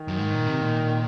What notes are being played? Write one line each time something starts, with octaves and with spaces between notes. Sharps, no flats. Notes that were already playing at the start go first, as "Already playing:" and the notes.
Already playing: D#3
F#2
G#2
A#2
C3
A#2